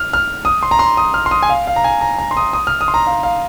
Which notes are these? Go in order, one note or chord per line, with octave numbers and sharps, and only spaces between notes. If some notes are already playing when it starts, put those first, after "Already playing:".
Already playing: F6
F6
D#6
C6
A#5
C6
D#6
F6
C6
D#6
G#5
F5
F5
A#5
G#5
A#5
A#5
C6
D#6
D#6
F6
D#6
C6
A#5
F5
F5